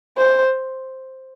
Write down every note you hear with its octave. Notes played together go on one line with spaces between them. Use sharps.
C5